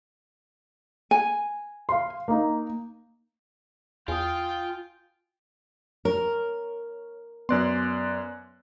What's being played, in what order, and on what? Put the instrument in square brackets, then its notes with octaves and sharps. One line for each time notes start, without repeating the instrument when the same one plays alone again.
[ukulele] G#5
[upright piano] F5 C6
A#3 D#4
[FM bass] E2 [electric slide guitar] F4 F5 [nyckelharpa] G5 [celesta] G#5 D#6
[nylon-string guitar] A#4 [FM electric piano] C#5
[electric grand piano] F#2 D5 C6 [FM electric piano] B3 F#6